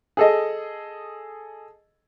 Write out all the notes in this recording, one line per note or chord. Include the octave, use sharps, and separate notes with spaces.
G#4 A4 D#5